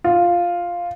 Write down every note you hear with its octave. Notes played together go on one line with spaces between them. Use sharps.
F4